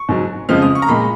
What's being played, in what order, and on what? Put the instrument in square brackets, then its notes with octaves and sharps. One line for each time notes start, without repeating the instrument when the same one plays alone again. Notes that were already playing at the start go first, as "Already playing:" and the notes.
Already playing: [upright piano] C#6
G#2 F#3
F2 C#3 F3 G#3 F6
D#6
C#6
A#5
A#2 G#3 B5